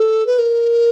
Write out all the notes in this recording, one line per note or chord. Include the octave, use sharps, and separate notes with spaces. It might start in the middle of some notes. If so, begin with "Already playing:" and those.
Already playing: A4
B4
A#4